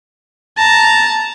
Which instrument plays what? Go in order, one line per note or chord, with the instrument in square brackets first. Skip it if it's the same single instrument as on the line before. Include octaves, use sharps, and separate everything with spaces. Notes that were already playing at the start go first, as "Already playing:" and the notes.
[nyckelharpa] A5 A#5